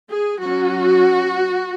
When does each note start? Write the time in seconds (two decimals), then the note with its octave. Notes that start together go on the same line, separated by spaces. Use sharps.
0.11 G#4
0.40 F#3 C#4 F#4